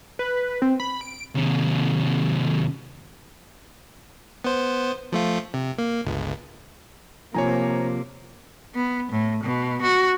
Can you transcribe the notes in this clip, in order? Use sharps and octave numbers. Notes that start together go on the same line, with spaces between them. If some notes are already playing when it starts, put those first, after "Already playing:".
B4
C4
B5
D7
D#2 C3
B3 C5
F3 A3 F4
C3
A#3
G1 C#2
C3 F3 A#3 C#5 G#5 A#5
B3
A2
B2
F#4